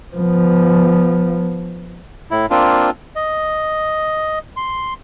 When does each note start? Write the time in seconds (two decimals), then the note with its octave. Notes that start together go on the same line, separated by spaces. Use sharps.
0.16 F3 B3
2.31 A2 E4
2.51 A#3 C4 D4 F4
3.16 D#5
4.57 C6